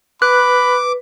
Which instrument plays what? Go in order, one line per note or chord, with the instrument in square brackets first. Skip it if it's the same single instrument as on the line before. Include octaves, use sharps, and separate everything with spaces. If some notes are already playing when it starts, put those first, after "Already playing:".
[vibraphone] B4 [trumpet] B5 [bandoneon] D6 [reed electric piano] F#6